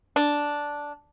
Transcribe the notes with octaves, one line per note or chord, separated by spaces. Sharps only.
D4